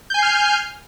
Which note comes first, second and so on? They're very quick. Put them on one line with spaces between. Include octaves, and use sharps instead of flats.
G6 G#5 C7 F6